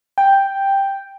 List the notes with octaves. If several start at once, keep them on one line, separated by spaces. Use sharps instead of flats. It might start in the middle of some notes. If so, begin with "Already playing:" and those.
G5